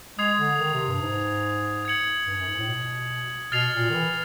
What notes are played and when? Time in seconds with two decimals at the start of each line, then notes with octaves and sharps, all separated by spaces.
0.18 G#3 D#6 G#6 C7 F7
0.39 D3
0.59 D#3
0.74 C3
0.88 G2
1.01 G#2
1.85 G#6 C#7 F#7
2.27 G2
2.38 F#2
2.48 G#2
2.58 A2
2.69 B2
3.52 B2 F6 A6 C7 F7
3.73 A#2
3.90 D#3
3.94 E3